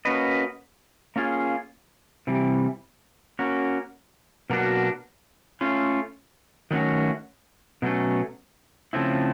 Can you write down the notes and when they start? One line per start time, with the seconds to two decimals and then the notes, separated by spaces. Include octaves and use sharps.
0.05 A#3 C#4 F#4 B4 D#5
1.16 A#3 C#4 F4 G#4
2.27 C3 E3 G3
3.39 A#3 C#4 F#4
4.50 B2 F#3 A#3 D4 F#4
5.61 A3 C#4 F4
6.71 D#3 F#3 A3 C#4 F#4
7.82 B2 F#3 A3 C#4
8.93 C#3 F3 A3 C4 E4